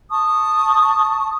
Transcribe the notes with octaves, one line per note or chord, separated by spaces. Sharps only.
A5 C#6 D#6